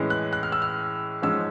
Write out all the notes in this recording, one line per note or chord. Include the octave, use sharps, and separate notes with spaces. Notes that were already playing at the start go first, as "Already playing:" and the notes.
Already playing: A2 E3 G#3 C#4
F#6
F#6
F6
E6
F6
G#2 F3 G#3 C#4 E6